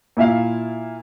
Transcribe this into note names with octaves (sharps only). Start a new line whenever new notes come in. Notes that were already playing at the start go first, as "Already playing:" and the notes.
A#2 E4 E5 F5